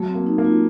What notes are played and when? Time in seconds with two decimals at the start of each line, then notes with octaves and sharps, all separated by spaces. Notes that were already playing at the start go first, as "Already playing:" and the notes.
Already playing: F#3 A3
0.08 C4
0.15 A#3
0.27 D#4
0.38 A#3
0.45 F4